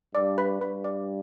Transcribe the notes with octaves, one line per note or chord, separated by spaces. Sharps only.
G2 D5
B4
G2 B4
D5